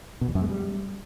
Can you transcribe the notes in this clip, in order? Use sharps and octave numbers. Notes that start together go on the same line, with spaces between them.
B2
E2
F#2
G#3
G3